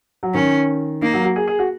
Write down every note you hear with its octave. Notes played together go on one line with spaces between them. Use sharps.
F#3
D#3 C#4
A#3 D#4
F#3
F#4
G#4
G#4
F#4